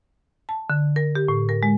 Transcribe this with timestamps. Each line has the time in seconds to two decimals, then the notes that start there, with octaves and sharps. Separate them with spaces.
0.49 A5
0.70 D3
0.96 A#4
1.15 G4
1.28 A2
1.49 A#4
1.63 G#3